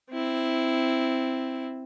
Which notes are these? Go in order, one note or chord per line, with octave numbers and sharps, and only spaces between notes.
C4 E4